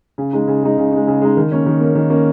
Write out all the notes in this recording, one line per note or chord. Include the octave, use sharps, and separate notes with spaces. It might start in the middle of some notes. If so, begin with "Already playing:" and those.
C#3
G#3 D#4
C#3
G#3 D#4
C#3
G#3 D#4
C#3
G#3 D#4
D#3
A#3 C#4
D#3
A#3 C#4
D#3
A#3 C#4